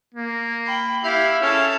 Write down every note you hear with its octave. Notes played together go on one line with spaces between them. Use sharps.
A#3
G5 B5
E4 G4 E5 F5
C#4 G#4 A4 A5